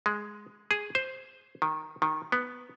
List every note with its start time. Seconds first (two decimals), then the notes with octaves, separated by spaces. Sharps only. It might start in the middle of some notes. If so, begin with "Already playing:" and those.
0.06 G#3
0.71 G#4
0.95 C5
1.62 D#3
2.02 D#3
2.32 B3